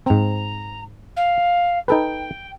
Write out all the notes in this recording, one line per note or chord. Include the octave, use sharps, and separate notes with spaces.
G#2 C4 A#5
F5
D#4 A4 B4 G5